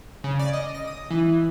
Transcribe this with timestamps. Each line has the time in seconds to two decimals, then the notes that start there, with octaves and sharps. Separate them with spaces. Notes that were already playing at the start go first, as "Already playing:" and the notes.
0.24 C#3
0.39 D5
0.53 D#5
0.75 A#6
0.87 D#6
1.10 E3